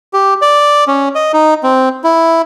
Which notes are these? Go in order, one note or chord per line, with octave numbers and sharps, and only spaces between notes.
G4
D5
C#4
D#5
D#4
C4
E4